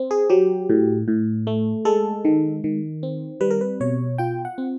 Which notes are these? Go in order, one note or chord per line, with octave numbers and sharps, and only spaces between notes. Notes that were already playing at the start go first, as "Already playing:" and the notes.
Already playing: C4
G#4
F#3 G4
A2
A2
A3
G#3 A4
D#3
D#3
C4
G3 B4
A#4
B4
B2 C#5
F4 G5
F#5
C4